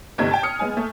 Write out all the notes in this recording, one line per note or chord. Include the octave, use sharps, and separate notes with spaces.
G1 C3 A3 D#4 G#6
G5 A5
D#6 F6 C#7
G#3 B3 G#5
A3